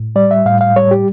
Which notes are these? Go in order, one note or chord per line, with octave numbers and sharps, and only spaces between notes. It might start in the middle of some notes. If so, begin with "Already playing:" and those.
Already playing: A2
G3 D5
E5
A2 F5
F5
G3 C#5
G4